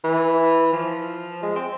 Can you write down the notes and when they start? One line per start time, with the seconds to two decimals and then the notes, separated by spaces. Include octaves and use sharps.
0.04 E3
0.73 F3
1.43 G#3
1.56 C4